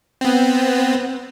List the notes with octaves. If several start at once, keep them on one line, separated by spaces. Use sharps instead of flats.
B3 C4